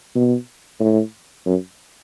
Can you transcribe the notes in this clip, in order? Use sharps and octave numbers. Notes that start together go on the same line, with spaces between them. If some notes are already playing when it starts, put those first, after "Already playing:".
B2
A2
F#2